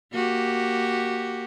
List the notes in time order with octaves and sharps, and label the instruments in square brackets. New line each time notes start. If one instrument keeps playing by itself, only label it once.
[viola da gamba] A#3 F#4 G4